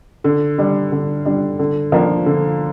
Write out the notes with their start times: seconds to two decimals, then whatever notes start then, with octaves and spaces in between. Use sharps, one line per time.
0.24 D3
0.58 G3 D4
0.92 D3
1.26 G3 D4
1.59 D3
1.92 F3 A#3 D4
2.26 D3